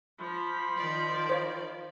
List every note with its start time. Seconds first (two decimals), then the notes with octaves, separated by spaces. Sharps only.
0.19 F3 B5 C6
0.77 D#3 F3 D5
1.29 C5 C#5 F5